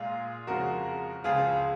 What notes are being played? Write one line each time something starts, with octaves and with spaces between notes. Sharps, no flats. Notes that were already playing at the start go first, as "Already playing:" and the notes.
Already playing: A#2 G#3 F4 G#4
F2 C#3 F3 G#3 F#4 A#4
C#2 C#3 F3 G#3 F4 G#4